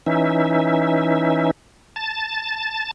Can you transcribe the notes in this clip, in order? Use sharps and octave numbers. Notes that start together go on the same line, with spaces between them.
E3 C#4 D#4 E5
A5 A6